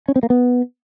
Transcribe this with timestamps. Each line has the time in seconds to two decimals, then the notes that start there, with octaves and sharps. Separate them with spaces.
0.08 C#4
0.16 C4
0.23 A#3
0.30 B3